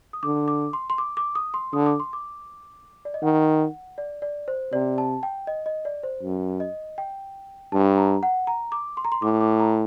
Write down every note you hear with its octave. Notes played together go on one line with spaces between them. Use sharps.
D#6
D3 D6
D6
C6
C6
D6
D6
D#6
C6
D3 D#6
D6
C6
D6
D5
D#5
D#3 F#5
D5
D5
C5
C3 D5
A5
G5
D#5
D#5
D5
C5
F#2
D#5
G5
G2 A5
A#5
F#5
A#5
D6
C6
A#5
C6
A2 D6
D6
A#5